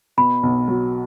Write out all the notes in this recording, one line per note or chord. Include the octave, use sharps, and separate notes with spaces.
B2 B5
B1
F#3